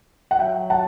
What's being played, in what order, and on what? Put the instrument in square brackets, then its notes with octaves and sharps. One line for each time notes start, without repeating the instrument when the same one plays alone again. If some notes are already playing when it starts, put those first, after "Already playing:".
[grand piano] F#5
[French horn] F#3 [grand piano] E5 G5
[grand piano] F#5 A5